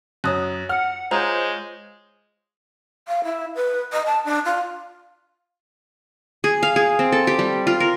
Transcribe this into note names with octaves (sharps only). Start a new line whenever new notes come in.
F#2 C#5 D#6 F#6
F#5 F6
G#3 F4 C5 C#5 A#5
F5
E4
B4
D#5
A5
D4
F4
G#4
F5
G#4
C4
A4
G4
G3
F4
A#4